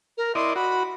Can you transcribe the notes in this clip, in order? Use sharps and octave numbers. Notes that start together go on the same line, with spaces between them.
A#4
E4 D5 D#5 C6
F#4 B5